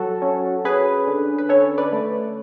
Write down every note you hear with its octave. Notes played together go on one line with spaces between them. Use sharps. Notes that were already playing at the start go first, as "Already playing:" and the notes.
Already playing: F#3 F#4 A4
C#4
C#4 G#4 B4
D3
B4
C#4 A4 C#5
B4 D5
A3